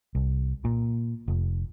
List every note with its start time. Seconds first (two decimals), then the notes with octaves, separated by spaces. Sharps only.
0.15 C2
0.65 A#2
1.28 F1